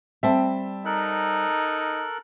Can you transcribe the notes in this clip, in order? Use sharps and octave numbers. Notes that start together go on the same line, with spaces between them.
G3 C4 E5 G5 A5
D#4 A4 A#4 F#6